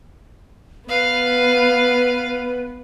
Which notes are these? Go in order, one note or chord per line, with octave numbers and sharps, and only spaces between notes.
B3 B4 F5